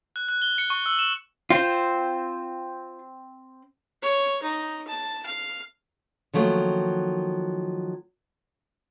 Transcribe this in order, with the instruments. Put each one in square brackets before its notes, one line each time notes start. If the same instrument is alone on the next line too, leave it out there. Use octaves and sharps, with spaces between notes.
[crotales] F#6
F#6
G7
C#7
C#6
E6
E7
[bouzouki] C4 C5 [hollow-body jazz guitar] F4
[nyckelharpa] C#5
D#4
A5
F5
[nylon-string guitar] D#3 F3 F#3 A3 A#3